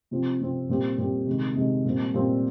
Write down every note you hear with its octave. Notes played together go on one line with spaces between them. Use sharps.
C3 F3 C4
C3 F3 C4
A#2 G3 C4 G4
A#2 G3 C4 G4
C3 D#3 G#3
C3 D#3 G#3
A#2 G3 C4
A#2 G3 C4